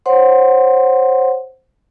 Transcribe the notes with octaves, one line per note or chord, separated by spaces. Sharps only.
C5 C#5 F#5 C6